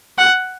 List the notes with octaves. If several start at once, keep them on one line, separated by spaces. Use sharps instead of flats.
F#5